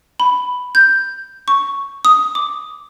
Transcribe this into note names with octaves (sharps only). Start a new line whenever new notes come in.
B5
G6
C#6
D#6
D6